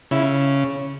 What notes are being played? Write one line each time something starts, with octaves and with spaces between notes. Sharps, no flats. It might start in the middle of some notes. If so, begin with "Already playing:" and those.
C#3 E4